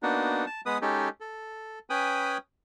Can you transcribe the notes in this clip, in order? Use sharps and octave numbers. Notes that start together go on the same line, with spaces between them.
A#3 B3 D4 D#4 F#4
A5
G#3 B3 B4 D#6
G#3 C#4 D#4 G4 A4
A4
C#4 B4 G5 G#5 B5 D#6